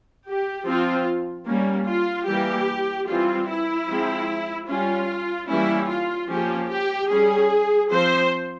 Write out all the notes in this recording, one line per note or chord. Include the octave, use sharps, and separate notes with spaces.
G4
F3 C4 F4
G3 A#3 C#4
F4
E3 G3 A#3 G4
E3 G3 C4 F4
E4
F3 G#3 C4
G3 C#4 F4
E3 G3 A#3 C#4 E4
F4
F3 A#3 C#4 G4
G4
G3 C#4 G#4
F3 C4 C5